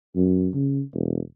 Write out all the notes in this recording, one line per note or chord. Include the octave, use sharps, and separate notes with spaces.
F#2
C#3
E1